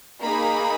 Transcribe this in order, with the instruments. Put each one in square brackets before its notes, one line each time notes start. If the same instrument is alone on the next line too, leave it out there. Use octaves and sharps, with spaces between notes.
[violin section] A#3 D#4 G#4 B5